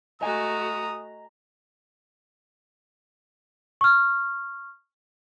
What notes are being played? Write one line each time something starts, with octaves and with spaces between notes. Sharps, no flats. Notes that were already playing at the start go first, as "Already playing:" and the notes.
A3 F#4 D#5 G#5 A#5 D#6
C#6 F6